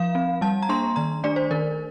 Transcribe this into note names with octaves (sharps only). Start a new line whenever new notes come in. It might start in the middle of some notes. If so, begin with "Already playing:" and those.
Already playing: F3 F5
C4
G3 A5
A#5
A#3 D4 C6
D#3 A#5
A3 D4 D5
C5
D#3 A#4